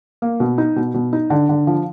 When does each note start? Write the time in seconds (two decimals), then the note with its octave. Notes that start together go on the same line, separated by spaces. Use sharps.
0.22 A#3
0.40 B2
0.58 D#4
0.76 B2
0.94 B2
1.13 D#4
1.30 D3
1.49 D3
1.67 F3